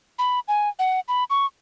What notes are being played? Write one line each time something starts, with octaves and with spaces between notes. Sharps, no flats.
B5
G#5
F#5
B5
C#6